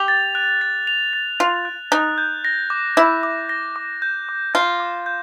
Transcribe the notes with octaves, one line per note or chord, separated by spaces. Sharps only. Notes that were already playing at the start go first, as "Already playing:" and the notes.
Already playing: G4 F7
A6
F#6
A6
F7
A6
F4 F7
F#6
D#4 F#6
G6
A#6
D6
E4 D6
D6
A#6
D6
G6
D6
F4 G6
D6
G6